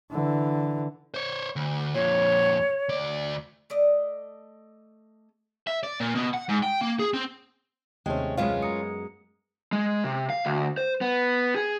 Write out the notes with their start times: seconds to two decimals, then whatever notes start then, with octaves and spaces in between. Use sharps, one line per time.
0.11 D3 E3
1.14 C5 C#5
1.56 D2
1.94 F2 A#2 C#5
2.89 D2 D5
3.70 A3 D5 D#5
5.67 E5
5.83 D5
6.00 A#2
6.15 B2
6.34 F#5
6.49 G#2
6.63 G5
6.81 A#3
7.00 G#4
7.14 C4
8.06 D#2 C3 G#3 A3 C#4 C5 G5
8.37 F#2 G#3 B3 C#4 F4 F5
8.63 A#5 D#6 C#7
9.72 G#3
10.04 C3
10.30 F5
10.45 D2
10.78 C5
11.01 B3
11.56 G#4